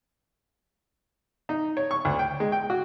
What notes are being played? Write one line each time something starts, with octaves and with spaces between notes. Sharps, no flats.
D#4
C#5
C#6
D2
G5
G#3
G5
F#4